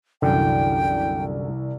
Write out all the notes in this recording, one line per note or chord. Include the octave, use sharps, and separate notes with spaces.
C2 F#2 D3 E3 G5